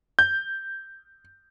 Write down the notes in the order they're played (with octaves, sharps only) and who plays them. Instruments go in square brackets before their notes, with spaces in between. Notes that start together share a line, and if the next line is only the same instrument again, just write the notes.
[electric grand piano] G6